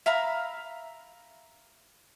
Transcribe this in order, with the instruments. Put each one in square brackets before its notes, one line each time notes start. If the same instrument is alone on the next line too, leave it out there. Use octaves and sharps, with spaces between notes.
[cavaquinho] E5 F5 A#5 B5